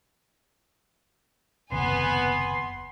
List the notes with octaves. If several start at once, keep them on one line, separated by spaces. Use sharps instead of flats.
F#1 D#2 C3 B3 G#5 C6